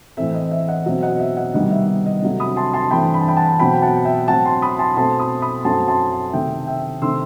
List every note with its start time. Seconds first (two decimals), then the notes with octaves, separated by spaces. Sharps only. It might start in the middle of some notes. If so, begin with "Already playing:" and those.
0.17 A2 E3 A3 C4 E5
0.34 D#5
0.51 E5
0.68 D#5 F#5
0.85 B2 F#3 C4 E5
1.02 D#5 F#5
1.20 E5
1.37 D#5 F#5
1.54 C3 D#3 G3 B3 D#5 F#5
1.71 E5
2.06 D#5
2.22 C3 F#3 A3
2.40 B5 D#6
2.57 A5 C6
2.73 A5 C6
2.91 G2 E3 A3 C4 G5 B5
3.14 B5
3.21 A5
3.28 G5 B5
3.37 F#5 A5
3.59 B2 F#3 C4 G5 B5
3.73 G5
3.82 F#5 A5
4.05 E5 G5
4.28 A2 F#3 C4 F#5 A5
4.45 A5 C6
4.62 B5 D#6
4.79 A5 C6
4.96 B2 A3 C4 A5 C6
5.19 B5 D#6
5.42 B5 D#6
5.65 F#2 F#3 A3 C4 A5 C6
5.88 A5 C6
6.33 C3 D#3 A3 E5 G5
6.67 E5 G5
7.02 C3 D#3 A3 C4 C6 E6